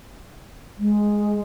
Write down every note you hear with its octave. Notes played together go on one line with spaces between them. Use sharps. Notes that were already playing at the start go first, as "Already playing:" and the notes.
G#3